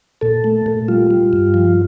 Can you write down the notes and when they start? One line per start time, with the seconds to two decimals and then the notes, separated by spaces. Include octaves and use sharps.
0.21 A#2 A4
0.44 A3
0.66 A#2
0.88 G3 F4
1.11 G3
1.33 G2
1.54 F3